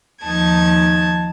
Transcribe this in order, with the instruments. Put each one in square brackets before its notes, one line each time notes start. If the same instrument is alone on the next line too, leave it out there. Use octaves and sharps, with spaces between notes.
[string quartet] D#2 F3 D#4 A5 G#6